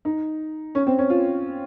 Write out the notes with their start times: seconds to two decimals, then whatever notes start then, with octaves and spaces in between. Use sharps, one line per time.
0.05 D#4
0.75 C#4
0.87 C4
0.99 C#4
1.10 F4